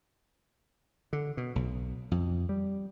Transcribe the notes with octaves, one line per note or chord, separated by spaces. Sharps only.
D3
B2
B1
F2
G3